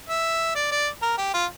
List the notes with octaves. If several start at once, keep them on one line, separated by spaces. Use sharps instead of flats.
E5
D5
D5
A#4
G4
F4